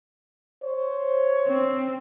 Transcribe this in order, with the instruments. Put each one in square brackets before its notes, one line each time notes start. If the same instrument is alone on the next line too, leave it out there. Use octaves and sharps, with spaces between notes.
[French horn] C5 [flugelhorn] C#5
[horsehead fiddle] C4